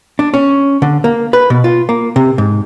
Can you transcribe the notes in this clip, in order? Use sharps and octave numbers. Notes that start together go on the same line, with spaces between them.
D4
C#4
D3
A#3
B4
B2
F4
A#3
C3
G#2